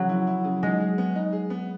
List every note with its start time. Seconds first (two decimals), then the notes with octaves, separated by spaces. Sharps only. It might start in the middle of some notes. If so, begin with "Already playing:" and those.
Already playing: C#3 F#3
0.09 E4
0.27 E4
0.44 C#3
0.63 G#3 D#4
0.80 G#4
0.98 B3
1.15 D#4
1.33 G#4
1.50 B3